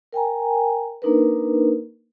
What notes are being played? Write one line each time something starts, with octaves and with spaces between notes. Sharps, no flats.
A#4 G5 G#5 A#5
A#3 D4 D#4 A#4 B4